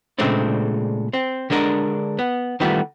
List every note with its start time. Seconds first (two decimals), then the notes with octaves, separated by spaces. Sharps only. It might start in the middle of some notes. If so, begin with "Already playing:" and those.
0.19 A#2 C#3 G#3 A3 C4 D4
1.13 C4
1.50 D3 G#3 D4 A#4
2.19 B3
2.60 D#3 E3 G3 A3 B3 F4